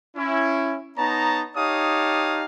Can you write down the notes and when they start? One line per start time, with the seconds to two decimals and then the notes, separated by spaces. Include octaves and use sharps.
0.16 C#4 E4
0.98 B3 D#4 C#5 A5 A#5
1.56 D#4 G4 C#5 F5 A5 D#6